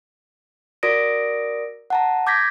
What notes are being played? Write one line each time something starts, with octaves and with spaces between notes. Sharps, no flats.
F#4 A#4 D5 D#6 A#6 D7
F#5 A5 A#5
D6 G6 G#6 A#6 B6